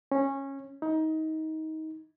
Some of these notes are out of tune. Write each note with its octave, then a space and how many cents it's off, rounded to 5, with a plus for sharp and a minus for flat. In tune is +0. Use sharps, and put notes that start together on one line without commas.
C#4 -15
D#4 +20